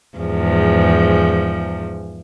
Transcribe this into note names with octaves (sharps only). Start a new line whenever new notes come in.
E2 G#2 F3